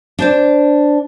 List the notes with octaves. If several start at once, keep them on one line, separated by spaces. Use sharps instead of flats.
D4 C5 D5